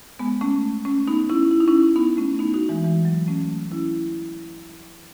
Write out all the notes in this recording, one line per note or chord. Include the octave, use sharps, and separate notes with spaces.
G#3 B3
A3 C#4
A3 C#4
B3 D#4
C#4 E4
E4
D#4
C#4 E4
B3 D#4
A3 C#4
B3 D#4
D#4 F#4
E3 G#3
E3 G#3
F#3
A3 C#4
C#4 E4